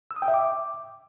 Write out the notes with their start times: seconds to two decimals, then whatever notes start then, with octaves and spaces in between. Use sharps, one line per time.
0.11 E6
0.16 D#6
0.22 G5
0.28 E5
0.34 D6